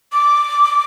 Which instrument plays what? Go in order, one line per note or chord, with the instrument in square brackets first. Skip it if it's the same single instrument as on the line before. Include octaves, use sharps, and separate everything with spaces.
[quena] D6